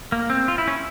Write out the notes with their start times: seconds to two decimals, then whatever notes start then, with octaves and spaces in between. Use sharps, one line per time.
0.12 A#3
0.30 C4
0.48 F4
0.58 E4
0.68 C#4